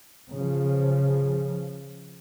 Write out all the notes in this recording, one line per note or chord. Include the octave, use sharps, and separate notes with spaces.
C#3 F3